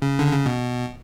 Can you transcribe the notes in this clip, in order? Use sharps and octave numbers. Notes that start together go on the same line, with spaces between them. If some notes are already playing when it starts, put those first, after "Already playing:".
C#3
D3
C#3
B2